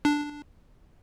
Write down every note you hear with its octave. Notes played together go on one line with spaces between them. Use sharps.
D4